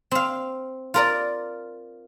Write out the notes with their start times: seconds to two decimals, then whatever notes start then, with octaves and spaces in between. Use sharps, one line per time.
0.11 C4 F5
0.94 F4 A#4 D5